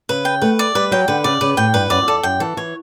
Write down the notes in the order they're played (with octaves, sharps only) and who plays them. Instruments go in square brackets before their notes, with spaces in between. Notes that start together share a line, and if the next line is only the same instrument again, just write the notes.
[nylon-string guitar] C#3 [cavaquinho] B4
[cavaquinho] G5
[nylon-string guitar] A3 [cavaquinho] B4
[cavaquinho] D5
[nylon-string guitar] G3 [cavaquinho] B4
[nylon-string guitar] F#3 [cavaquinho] G5
[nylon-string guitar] D3 [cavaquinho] B4
[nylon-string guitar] C#3 [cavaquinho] D5
[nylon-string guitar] C#3 [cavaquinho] B4
[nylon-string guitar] A2 [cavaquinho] G5
[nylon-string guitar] G2 [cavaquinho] B4
[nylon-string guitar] F#2 [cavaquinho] D5
[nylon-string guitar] F#2
[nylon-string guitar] E2 [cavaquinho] A4
[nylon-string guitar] F#2 [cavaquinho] G5
[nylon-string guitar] E3 [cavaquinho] A4
[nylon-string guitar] E3 [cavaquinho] C#5